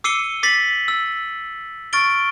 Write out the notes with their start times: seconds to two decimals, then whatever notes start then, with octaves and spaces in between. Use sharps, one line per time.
0.04 D6 E6 C7 C#7 D#7 G7
0.43 D6 A6 B6 C7 F#7
0.88 E6
1.93 C#6 F6 A6 D7 G7